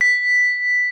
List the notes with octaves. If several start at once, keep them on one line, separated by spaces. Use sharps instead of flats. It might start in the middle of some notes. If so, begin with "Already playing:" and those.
B6